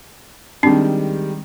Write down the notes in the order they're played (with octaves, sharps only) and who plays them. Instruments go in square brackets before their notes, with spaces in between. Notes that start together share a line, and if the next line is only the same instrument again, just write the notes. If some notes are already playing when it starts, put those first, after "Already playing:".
[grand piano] D#3 G3 G#3 [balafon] C4 D4